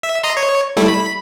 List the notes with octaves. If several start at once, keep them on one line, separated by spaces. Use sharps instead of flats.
E5
D#5 A#5 C6
C#5
G3 A3 E4
B5